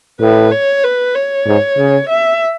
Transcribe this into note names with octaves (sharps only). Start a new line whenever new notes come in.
A2 B4
C#5
B4
C#5
G#2
C#3
E5